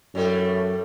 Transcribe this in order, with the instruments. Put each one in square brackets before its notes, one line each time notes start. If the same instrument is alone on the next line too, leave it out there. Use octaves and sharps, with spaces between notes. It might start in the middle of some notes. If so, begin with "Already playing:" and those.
[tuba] F#2 [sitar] A2 G3 A3